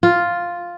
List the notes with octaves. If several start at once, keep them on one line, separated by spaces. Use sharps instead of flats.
F4